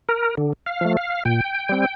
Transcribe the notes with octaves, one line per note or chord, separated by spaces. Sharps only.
A#4
D3
F5
F3 A3
F5
A#2 G5
G3 C4